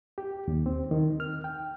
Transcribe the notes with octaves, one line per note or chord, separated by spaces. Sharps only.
G4
D#2
C4
D#3
F6
G5